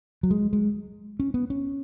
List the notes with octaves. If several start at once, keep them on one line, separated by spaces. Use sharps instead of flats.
F#3
G#3
G#3
C#4
B3
C#4